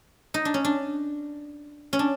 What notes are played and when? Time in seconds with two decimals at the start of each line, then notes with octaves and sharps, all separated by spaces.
0.34 D#4
0.45 D4
0.54 C#4
0.65 D4
1.93 C#4
1.99 D4